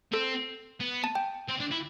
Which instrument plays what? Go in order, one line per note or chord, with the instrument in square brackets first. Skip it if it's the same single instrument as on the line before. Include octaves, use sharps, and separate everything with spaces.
[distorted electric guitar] C4 [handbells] A4
[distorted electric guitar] B3
[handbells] A5
G5
[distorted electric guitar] C4
D4
E4